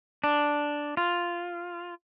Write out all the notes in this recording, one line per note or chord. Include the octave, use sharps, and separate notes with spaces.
D4
F4